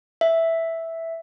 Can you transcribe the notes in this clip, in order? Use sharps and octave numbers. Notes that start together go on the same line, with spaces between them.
E5